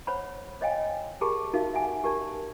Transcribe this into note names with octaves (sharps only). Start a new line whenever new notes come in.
C5 C#5 F#5 B5
C#5 D#5 F5 G5 G#5
G4 G#4 A#4 A5 B5
D#4 F#4 A#4 E5 F5
E5 F#5 G#5
G4 A#4 D5 A5